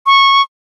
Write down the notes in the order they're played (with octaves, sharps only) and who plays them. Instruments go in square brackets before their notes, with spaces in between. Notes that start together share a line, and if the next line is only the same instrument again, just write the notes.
[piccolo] C#6